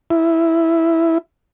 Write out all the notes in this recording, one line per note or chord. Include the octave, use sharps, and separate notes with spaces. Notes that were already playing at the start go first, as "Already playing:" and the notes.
E4